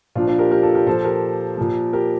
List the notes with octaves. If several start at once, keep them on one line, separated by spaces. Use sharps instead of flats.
A#2 F3 D4 F4
D4 F4
G4 A#4
G4 A#4
F4 A4
G4 A#4
A#2 F3 A4 C5
G4 A#4
A#2 F3
G4 A#4